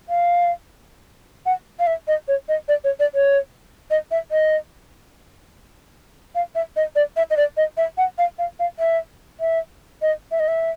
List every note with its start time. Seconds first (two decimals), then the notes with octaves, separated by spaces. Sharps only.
0.09 F5
1.46 F#5
1.79 F5
1.87 E5
2.08 D#5
2.28 C#5
2.48 D#5
2.68 D5
2.84 C#5
3.00 D5
3.15 C#5
3.90 D#5
4.11 E5
4.31 D#5
6.35 F5
6.55 E5
6.76 D#5
6.95 D5
7.16 E5
7.30 D#5
7.37 D5
7.57 D#5
7.77 E5
7.98 F#5
8.18 F5
8.38 F5
8.59 F5
8.79 E5
9.40 E5
10.02 D#5
10.31 E5
10.40 D#5
10.48 E5